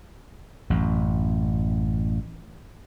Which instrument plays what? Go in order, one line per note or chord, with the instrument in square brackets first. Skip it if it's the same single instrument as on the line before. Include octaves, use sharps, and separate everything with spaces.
[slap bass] A1 F#2